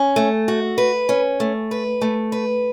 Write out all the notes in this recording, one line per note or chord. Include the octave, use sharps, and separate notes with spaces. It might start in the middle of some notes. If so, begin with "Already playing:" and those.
Already playing: C#4
A3
F#4
B4
C#4
A3
B4
A3
B4